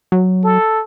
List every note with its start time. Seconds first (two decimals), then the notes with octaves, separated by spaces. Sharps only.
0.12 F#3
0.44 A4